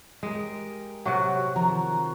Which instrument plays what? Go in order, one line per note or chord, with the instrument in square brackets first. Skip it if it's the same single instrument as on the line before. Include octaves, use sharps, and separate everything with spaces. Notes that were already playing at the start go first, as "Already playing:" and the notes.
[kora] G#3 [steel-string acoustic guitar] G4 A#4
[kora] C3 F#3 [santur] F#4 F#5 C#6
[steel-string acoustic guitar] D#3 F3 [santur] A#5 C6